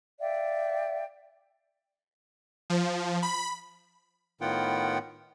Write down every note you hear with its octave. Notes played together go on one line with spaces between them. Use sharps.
D5 E5 F5 G5
F3
B5
A2 D#3 B3 F4 F#5 G5